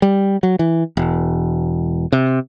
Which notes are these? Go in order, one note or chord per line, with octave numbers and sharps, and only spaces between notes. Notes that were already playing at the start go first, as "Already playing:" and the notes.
G3
F#3
E3
E1
C3